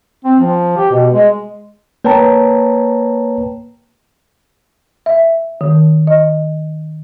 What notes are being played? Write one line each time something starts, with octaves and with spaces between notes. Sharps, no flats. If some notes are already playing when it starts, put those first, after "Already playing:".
C4
F3
G4
B2
G#3
A#3 B4 C#5 G5 A5 A#5
E5
D#3
D#5